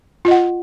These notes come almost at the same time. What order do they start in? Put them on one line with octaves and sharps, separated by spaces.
F4 D#5 F#5